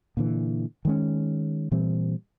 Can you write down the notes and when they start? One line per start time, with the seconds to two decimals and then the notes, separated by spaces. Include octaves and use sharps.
0.17 A#2 D3 E3
0.85 D#3 G#3 C#4
1.72 A#2 E3 G3 C4